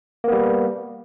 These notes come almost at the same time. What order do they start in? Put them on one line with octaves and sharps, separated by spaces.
A#3 B3 G3